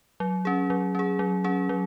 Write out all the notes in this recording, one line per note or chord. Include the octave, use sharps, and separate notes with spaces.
F#3
C#4 G#4
F#3
C#4 G#4
F#3
C#4 G#4
F#3